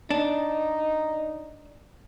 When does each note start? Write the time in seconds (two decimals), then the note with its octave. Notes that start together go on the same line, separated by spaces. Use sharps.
0.10 D4 D#4